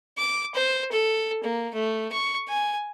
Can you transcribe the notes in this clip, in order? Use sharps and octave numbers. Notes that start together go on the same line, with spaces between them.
D6
C5
A4
A#3
A3
C#6
G#5